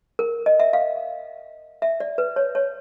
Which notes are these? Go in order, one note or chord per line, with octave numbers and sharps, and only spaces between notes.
A#4
D#5
E5
F5
E5
D5
B4
C#5
C#5